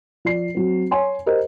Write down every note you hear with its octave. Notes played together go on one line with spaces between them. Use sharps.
F3 D5 C7
F#3 C4
C#5 G#5 C6
G4 A#4 C5 D#5